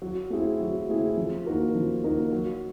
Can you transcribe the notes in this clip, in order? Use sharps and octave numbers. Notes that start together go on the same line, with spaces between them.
F#3
A3 C4 E4 G#4
F#3
A3 C4 E4 G#4
F3
A#3 D#4 F#4 A#4
F3
A#3 D#4 F#4 A#4
F#3